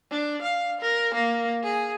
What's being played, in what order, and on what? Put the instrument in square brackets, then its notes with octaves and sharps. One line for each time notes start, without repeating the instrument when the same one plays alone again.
[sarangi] D4
F5
A#4
A#3
G#4